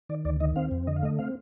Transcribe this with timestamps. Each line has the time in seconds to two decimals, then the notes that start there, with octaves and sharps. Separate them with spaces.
0.09 D#3 D5
0.25 D2 D5
0.40 D#3 D#5
0.56 C4 F5
0.71 F2
0.87 D3 D#5
0.96 F5
1.03 A3 D#5
1.19 C4 F5